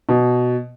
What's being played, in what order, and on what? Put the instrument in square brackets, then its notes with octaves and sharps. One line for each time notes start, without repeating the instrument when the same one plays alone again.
[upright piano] B2